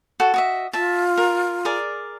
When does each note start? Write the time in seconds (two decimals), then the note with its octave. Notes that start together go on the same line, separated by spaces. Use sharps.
0.20 F#4 A4
0.34 F#4 D#5 E5
0.73 F4 E5 A5
1.17 A#4
1.65 G#4 A#4 D5